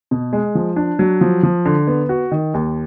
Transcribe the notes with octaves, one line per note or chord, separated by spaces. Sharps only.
B2
G#3
F3
D4
F#3
F3
F3
D3
B3
F#4
D#3
D#2